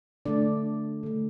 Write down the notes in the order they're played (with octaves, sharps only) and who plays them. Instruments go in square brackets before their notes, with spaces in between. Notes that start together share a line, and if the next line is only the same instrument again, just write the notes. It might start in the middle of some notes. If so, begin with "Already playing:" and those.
[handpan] D3 A3 D4 D5
D3 A3